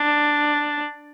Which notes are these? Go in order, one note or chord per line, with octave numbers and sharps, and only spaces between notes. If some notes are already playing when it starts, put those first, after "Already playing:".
Already playing: D4